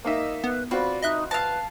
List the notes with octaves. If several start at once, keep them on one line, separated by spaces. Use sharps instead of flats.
A#3 D#4 D#5 E5
B3 B4
C4 F4 F#4 B4 D5
D#4 D#5 E5 F#6
B4 F5 A5